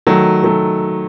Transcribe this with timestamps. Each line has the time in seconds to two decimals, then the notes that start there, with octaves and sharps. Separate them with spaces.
0.07 D#3 F#3 A3
0.44 D#3 F#3 A3